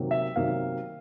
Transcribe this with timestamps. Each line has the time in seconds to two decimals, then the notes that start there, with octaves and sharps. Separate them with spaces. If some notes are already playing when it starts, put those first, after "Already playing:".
Already playing: C3 D#3 F#3 A#3
0.11 E5
0.36 C3 D#3 F#3 A#3 F5